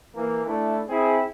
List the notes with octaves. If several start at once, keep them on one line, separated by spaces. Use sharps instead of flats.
E3 A#3
A3 D4 E4
C4 E4 G#4